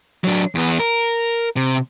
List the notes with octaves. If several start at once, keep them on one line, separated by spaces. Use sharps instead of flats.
F#3 D4
E2 B3
A#4
C3